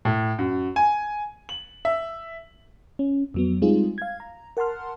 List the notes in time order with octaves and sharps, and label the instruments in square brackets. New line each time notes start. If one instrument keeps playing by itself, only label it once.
[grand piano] A2
F#2
G#5
F#7
E5
[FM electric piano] C#4
F2 F#3 B3
G3 G#3 C4 D#4 F4 G#4
F5 G#6
A#5
A#4 F#5 A5 C6 F6